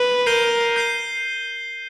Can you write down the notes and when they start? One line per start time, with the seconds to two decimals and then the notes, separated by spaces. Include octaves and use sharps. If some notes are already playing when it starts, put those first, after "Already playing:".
Already playing: B4
0.26 A#4 G6 C7 D#7 G7
0.76 G6 C7 D#7 G7